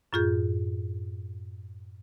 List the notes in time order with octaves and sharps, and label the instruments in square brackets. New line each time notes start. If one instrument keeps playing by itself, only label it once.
[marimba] F#2 A2 F4 G#4 G6